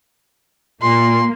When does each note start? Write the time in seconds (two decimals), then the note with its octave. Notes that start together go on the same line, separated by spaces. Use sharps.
0.82 A#2 A#3 C6